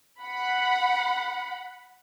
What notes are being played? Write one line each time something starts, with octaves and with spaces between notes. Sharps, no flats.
F#5 B5